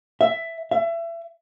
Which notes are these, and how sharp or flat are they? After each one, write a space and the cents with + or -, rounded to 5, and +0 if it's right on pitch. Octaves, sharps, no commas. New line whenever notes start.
E5 +10
E5 +30